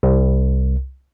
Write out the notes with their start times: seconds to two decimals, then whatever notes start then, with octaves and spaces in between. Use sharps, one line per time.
0.03 C2